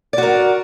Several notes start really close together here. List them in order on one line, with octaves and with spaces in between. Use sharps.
D5 F#4 A#4